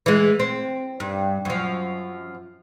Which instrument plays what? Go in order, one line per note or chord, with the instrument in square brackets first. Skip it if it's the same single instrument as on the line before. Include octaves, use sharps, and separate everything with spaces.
[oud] E3 G#3
C4
G2
F#2 F3